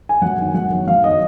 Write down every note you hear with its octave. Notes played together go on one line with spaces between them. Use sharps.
G#5
F#2 F#5
D#3 F#3
G#5
F#2 F#5
D#3 F#3
F#2 F5
D#3 F#3 D#5